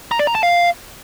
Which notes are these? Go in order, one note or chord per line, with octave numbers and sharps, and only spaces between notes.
A#5
D5
A#5
A5
F5